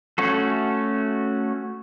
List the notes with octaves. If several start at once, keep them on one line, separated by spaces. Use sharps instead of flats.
A3 C#4 F#4 A4